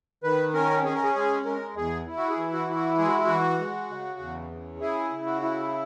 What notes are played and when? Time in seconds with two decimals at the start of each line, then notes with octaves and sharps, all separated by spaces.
0.24 D#3 B4
0.54 C#4 A#4
0.84 C#4 G#4
0.94 A#4
1.03 G#4
1.15 G#3 G#4
1.45 G#3 A#4
1.75 E2 G#4
2.07 E4
2.17 F#4
2.29 G#4
2.37 E3
2.53 F#4
2.68 E4
2.75 F#4
2.98 G#3 G#4
3.07 F#4
3.25 E3 F#4
3.59 G#3
3.90 C#3
4.19 E2
4.51 C#3
4.80 E4 G#4
5.11 C#3
5.26 F#4
5.42 E4